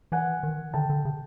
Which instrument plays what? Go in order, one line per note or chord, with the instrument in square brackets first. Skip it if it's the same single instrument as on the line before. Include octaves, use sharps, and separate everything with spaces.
[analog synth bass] E3 [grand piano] F#5 G#5
[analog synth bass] D#3
[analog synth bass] D3 [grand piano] G5 A5
[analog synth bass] D3
C#3